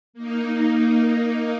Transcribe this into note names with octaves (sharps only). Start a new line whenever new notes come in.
A#3 D#4